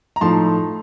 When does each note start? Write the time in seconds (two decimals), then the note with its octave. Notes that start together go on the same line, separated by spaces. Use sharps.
0.16 A#5
0.21 A2 F3 A3 D#4 A5 C6